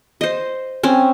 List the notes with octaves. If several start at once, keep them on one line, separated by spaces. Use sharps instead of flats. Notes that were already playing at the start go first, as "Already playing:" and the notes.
C5 D#5
C4 C#4